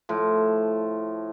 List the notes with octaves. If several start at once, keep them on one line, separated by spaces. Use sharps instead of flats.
A2 F3